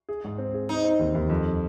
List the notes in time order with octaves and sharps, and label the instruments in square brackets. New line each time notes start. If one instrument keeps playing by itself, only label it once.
[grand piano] G#4
G#2
C4
G#4
[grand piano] C4 [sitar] D#4
[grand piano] C4
D#2
D#2
F2